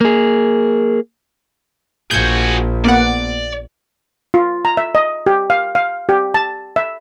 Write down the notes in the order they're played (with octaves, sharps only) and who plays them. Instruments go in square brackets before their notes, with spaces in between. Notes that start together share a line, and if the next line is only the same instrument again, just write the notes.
[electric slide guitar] A#3 G#4
[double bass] A#1 [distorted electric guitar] F#4 G#4 [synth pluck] G6 G#6
[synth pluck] A#3 B3 F#5 [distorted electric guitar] D5
[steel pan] F4
A#5
E5
D#5
G4
F5
F5
G4
A5
E5